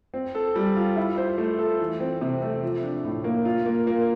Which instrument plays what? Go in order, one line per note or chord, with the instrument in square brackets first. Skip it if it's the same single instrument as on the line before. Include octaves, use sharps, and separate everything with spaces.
[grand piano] C4
A4
G3
F4
E4
C5
A3
A4
E3
C4
C3
A3
F3
D4
A2
A#3
F4
A#3
A#3